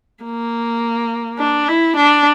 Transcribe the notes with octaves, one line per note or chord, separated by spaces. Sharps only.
A#3
D4
E4
D4